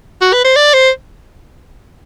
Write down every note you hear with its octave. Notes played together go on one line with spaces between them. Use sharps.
F#4
B4
C5
D5
C5